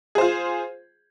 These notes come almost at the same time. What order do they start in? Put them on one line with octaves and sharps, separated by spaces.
G#4 C5 F4